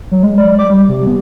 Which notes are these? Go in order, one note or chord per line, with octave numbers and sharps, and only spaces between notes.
F#3
G#3
D5
D6
G3
C3
B3